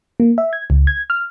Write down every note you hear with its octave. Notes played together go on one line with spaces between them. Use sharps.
A#3
E5
G#6
C#2
G#6
F6